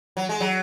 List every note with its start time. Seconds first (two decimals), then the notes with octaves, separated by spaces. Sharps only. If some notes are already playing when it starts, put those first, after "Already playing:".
0.17 F#3
0.29 G#3
0.41 F#3